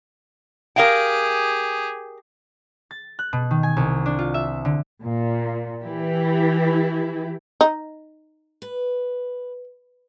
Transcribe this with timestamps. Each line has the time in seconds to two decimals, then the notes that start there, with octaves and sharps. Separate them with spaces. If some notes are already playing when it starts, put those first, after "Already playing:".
0.76 G4 G#4 A#4 F5 G5
2.91 A6
3.19 F#6
3.33 B2
3.51 D#3
3.63 G#5
3.77 C2
4.06 D4
4.19 F4
4.34 E5
4.65 D3
5.04 A#2
5.83 E3 E4 G4
7.61 D#4
8.62 B4